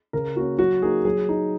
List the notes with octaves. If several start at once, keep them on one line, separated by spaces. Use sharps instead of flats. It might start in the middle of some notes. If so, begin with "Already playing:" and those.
C#3 A#4
A#3 C#4 F#4
F#3 F#4
A#3 D#4 G#4
F#3 G#4
D#4